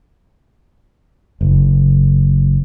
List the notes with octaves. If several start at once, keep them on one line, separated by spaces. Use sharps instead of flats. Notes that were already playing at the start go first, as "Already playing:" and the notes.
F#1